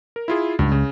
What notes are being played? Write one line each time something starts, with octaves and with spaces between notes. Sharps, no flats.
A#4
E4 F4 G#4
C#2 G2
C#3